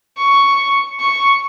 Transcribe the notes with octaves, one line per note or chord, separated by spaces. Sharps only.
C#6
C#6